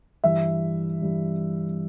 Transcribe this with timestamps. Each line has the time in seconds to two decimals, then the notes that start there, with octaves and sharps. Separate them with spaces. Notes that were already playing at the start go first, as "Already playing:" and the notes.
0.24 G2 E3 E5
1.02 G2 E3